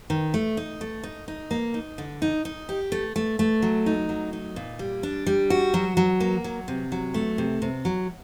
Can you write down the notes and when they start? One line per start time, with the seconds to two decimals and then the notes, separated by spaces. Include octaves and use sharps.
0.10 D#3
0.34 A3
0.57 D#4
0.81 A3
1.03 D#4
1.28 D#4
1.51 A#3
1.74 D#4
1.98 D3
2.22 D#4
2.45 D#4
2.69 G4
2.92 A3
3.16 A3
3.39 A3
3.62 F#3
3.86 D#4
4.09 F#3
4.33 D#4
4.56 A#2
4.79 G3
5.03 D4
5.27 G3
5.50 F#4
5.74 F#3
5.97 F#3
6.20 A#3
6.44 F#3
6.68 C3
6.92 F#3
7.14 A3
7.38 C3
7.62 C3
7.85 F#3